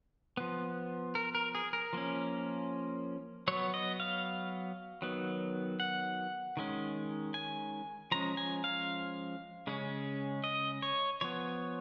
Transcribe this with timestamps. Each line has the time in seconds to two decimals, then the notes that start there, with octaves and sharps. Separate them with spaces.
0.37 F3 B3
1.15 A#4
1.35 A#4
1.55 G#4
1.73 A#4
1.93 F3 A#3 C#4
3.48 F#3 B3 C#5
3.74 D#5
4.00 F5
5.02 D#3 F#3 B3
5.80 F#5
6.57 D#3 G#3 C#4
7.34 G#5
8.12 F3 G#3 C#4 A#5
8.37 G#5
8.64 F5
9.67 C#3 G#3 C#4
10.44 D#5
10.82 C#5
11.21 F3 B3 C#5